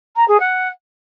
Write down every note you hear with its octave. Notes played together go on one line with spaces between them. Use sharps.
A#5
G#4
F#5